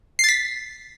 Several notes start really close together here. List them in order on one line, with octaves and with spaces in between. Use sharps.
C7 A6 B6